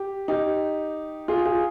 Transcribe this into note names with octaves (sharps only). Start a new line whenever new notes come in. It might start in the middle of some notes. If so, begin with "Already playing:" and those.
Already playing: G4
D#4 G4
F4 G#4
F4 G#4